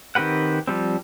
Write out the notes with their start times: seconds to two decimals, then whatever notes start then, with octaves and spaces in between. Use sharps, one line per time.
0.15 D#3 C4 G4 B4 F#5
0.67 F3 G3 C4